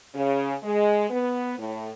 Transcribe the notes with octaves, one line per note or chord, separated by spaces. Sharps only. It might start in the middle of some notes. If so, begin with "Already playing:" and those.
C#3
G#3
B3
A2